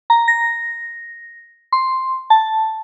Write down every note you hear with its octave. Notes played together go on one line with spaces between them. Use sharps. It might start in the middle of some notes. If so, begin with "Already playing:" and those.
A#5
A#6
C6
A5